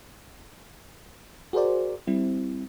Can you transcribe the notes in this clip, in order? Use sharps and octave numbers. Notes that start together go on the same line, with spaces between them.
F#4 G#4 A#4 C5 D5
G3 C4 E4